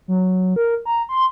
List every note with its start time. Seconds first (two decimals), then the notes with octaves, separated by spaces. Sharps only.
0.08 F#3
0.56 A#4
0.86 A#5
1.09 C6